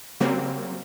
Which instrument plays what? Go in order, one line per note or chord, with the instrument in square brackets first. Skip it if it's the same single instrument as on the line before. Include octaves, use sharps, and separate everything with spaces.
[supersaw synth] C#3 F#3 G3 A#3 C4